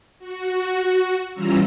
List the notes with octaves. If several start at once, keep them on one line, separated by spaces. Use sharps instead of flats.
F#4
E3 G3 C#4 F4 A#5 E6